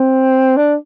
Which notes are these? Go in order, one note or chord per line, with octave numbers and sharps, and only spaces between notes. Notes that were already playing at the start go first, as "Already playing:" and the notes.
Already playing: C4
D4